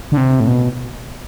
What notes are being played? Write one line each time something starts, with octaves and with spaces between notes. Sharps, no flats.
D3
C3
A2
B2